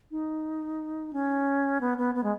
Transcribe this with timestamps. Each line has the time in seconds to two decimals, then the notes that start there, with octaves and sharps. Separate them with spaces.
0.11 D#4
1.13 C#4
1.81 B3
1.98 B3
2.15 B3
2.24 G#3